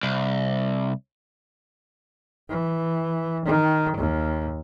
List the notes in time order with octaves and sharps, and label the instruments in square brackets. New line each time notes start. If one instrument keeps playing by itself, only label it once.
[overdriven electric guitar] C2
[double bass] E3
D#3
D#2